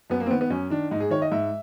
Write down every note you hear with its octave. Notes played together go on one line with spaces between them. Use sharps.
F#2 B3
A#3
C4
D#3 B3
B3
F#2 C#4
D#3 D4
G#2 D#4
G#4
D#3 C#5
D#5
G#2 E5